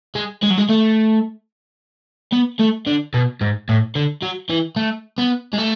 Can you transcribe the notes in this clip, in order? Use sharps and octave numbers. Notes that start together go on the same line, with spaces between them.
G#3
G#3
F#3
G#3
A3
B3
A3
D3
B2
G#2
A2
D3
F#3
E3
A3
B3
G#3
A3